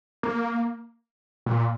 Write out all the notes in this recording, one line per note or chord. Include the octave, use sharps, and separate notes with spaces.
A#3
A#2